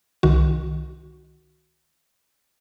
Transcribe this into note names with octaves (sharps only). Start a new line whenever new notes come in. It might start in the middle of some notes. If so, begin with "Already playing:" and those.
C2 D#3 F#4